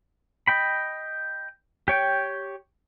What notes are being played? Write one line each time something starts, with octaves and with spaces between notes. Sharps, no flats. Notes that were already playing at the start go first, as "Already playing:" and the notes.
D#5 G5 B5
G4 C#5 G5